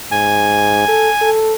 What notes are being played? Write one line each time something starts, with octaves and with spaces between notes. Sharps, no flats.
G#2 G#5
A4
A4